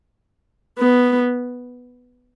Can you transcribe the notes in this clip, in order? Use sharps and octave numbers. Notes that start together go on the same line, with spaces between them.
B3